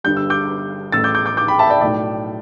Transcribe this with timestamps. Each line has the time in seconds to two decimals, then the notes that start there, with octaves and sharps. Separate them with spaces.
0.04 G1 G2 G3 G6
0.17 E6
0.30 D6 G6
0.92 A1 A2 A3 E6 A6
1.04 D6 G6
1.15 D6 G6
1.26 D6 G6
1.37 D6 G6
1.48 G5 B5
1.59 E5 A5
1.70 D5 G5
1.81 B1 A2 A3 D5 G5